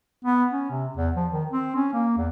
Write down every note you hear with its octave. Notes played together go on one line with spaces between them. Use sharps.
B3
C#4
C3
E2
F3
D#3
C4
C#4
A#3
E2